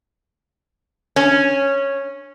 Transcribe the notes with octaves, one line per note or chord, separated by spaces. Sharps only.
C#4